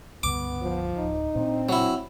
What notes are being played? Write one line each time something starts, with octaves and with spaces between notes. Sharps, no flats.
C#2 G2 D3 B3 D6
F3
D1 D#4
A#2 G#3 C4 D4
F#3 E4